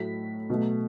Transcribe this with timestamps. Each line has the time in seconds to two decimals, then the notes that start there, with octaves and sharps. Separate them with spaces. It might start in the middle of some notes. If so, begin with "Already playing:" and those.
Already playing: A2 F#3 A3 B6
0.50 B2 F#3 A3